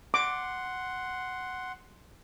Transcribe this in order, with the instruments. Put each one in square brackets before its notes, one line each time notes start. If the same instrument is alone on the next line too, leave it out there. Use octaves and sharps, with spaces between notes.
[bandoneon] F#5 C6 [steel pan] D6